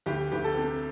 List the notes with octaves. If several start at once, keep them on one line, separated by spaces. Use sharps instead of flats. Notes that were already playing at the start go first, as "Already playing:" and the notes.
D2 G4
D2 G4
A4
C3